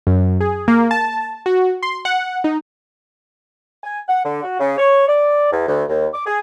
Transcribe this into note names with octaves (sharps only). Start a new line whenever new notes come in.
F#2
G#4
A#3
A5
F#4
C6
F#5
D#4
G#5
F#5
D3
F#4
C#3
C#5
D5
E2
D2
D#2
D6
G#4